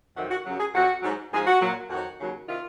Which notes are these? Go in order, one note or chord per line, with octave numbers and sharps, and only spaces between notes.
F2 C3 D#3 F#3 F#4
F#4
F#2 C#3 F#3
G#4
F2 C3 F#3 F#4
G#2 F#3
G#2 F3 G#4
F#4
A#2 F#3
F2 D#3 F#3 F#4
D#2 C#3 F#3
C3 D#3 F4